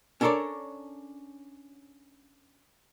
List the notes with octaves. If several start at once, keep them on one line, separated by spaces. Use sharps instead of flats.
C#4 D4 A4 A#4 C#5 D5